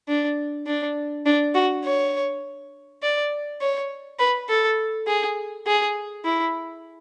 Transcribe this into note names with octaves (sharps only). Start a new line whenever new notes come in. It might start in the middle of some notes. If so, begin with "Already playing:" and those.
D4
D4
D4
F#4
C#5
D5
C#5
B4
A4
G#4
G#4
E4